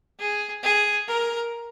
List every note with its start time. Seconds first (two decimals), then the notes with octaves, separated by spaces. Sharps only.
0.20 G#4
0.63 G#4
1.07 A#4